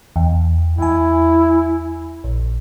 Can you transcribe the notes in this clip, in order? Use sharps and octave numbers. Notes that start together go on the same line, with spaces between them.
E2
E2 E4 G#5
A#1